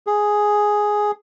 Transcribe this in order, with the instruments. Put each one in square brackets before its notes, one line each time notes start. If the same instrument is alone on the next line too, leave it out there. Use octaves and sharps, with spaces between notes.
[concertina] G#4